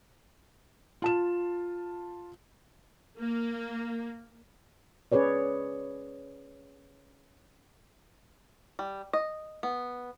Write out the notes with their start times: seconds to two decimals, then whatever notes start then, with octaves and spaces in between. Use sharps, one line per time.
1.02 F4 A5 E7
3.18 A#3
5.12 C#4 G#4 B4 C#5 D5
8.79 G3
9.13 D#5
9.63 B3